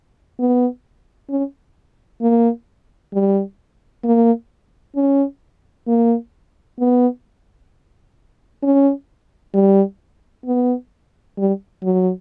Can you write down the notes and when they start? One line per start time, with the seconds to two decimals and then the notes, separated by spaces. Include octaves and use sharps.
0.39 B3
1.30 C#4
2.21 A#3
3.13 G3
4.04 A#3
4.96 C#4
5.88 A#3
6.80 B3
8.63 C#4
9.54 G3
10.46 B3
11.38 G3
11.83 F#3